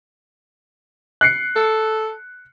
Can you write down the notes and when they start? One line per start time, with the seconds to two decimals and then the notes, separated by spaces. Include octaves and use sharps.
1.21 F#6 C7 C#7
1.56 A4